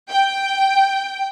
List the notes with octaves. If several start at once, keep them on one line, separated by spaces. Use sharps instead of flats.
G5